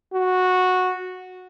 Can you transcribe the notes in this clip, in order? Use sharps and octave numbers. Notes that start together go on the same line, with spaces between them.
F#4